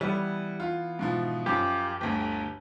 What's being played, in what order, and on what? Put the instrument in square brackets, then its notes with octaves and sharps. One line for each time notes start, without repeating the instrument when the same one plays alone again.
[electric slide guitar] E3 B3 [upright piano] G3
[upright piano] F4
G#2 B2 F3
[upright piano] F#2 F3 [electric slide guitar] G4
[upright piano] G1 D2